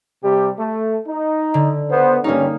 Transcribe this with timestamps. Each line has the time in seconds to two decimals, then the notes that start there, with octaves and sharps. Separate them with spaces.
0.24 C3 G3 G4
0.59 A3
1.08 D#4
1.54 D3
1.90 B3 C5
2.24 G2 G3 A#3 C#4 D#4